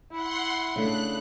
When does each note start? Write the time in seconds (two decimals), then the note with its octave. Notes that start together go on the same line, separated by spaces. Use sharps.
0.11 E4 F#5 C6
0.76 C#3 A3 D4 F#6